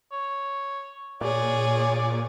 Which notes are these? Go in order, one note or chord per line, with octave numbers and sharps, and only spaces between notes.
C#5
A#2 G#4 C#5 D5